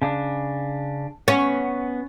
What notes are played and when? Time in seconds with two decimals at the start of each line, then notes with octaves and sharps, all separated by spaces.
0.02 C#3 D4
1.28 B3 C#4 F#5